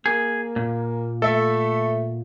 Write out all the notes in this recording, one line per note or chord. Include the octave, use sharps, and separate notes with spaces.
A#3 G#4
A#2
A3 A4 E5